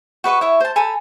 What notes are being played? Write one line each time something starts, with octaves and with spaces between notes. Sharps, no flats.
F#4 B4 D#5 C#6
E4 C#5 E5
C5 A5
A4 G#5 A#5 B5